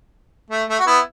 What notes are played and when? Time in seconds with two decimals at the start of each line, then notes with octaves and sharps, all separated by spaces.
0.50 A3
0.69 A3
0.80 F#4
0.87 B3 E4